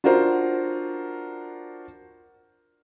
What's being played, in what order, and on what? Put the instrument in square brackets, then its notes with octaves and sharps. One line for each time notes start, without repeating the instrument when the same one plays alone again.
[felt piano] D4 F4 F#4 A#4 C5